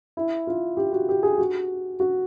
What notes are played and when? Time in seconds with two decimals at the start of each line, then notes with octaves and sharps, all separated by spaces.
0.17 E4
0.47 F4
0.77 G4
0.93 F#4
1.09 G4
1.23 G#4
1.38 F#4
2.00 F#4